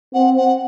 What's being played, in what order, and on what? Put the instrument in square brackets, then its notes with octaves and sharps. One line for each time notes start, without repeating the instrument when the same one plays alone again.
[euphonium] C4 [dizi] F#5
[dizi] F#5